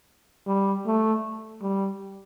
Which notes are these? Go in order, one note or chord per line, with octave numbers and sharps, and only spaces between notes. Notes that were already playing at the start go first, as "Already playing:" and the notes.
G3
A3
G3